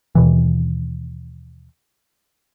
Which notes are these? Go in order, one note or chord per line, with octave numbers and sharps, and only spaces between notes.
D#2 B2 E3